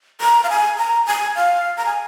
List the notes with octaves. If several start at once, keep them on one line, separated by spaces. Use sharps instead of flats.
A#5
F5
G#5
A#5
G#5
F5
A#5
G#5